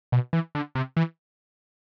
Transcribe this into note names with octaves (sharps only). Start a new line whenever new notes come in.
B2
E3
D3
C3
E3